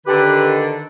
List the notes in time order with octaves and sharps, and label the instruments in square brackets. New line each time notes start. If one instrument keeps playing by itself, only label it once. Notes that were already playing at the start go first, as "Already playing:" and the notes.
[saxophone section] D3 D#3 [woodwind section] G4 B4